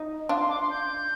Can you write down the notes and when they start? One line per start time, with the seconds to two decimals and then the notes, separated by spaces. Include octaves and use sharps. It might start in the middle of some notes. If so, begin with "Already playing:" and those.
Already playing: D#4
0.29 D4 F4
0.40 C6
0.50 D6
0.61 C6
0.71 G6